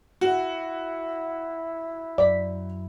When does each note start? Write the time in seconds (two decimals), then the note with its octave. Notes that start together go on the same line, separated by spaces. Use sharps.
0.21 E4 F#4
2.18 F#2 D5 B6